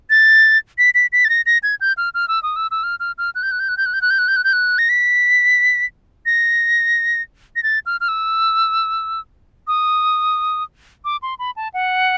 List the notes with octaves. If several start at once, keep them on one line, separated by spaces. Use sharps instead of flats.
A6
B6
B6
B6
A6
A#6
A#6
G#6
G6
F6
F6
E6
D#6
E6
E6
F6
F6
F6
F#6
G6
F#6
G6
F#6
G6
F#6
G6
F#6
G6
F#6
G6
F#6
G6
F#6
A#6
B6
A#6
A#6
A6
F6
F6
E6
D#6
D6
C6
B5
A5
F#5